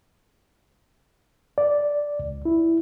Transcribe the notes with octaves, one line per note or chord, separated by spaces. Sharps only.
D5
C#2
E4